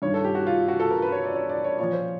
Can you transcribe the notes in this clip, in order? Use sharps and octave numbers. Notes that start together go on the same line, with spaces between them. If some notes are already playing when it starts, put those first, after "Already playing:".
G2 D#3 C#5
A4
G4
F#4
F4
F#4
A4
A#4
B4
C#5
D5
C#5
D5
C#5
A#2 F3 C#5
C5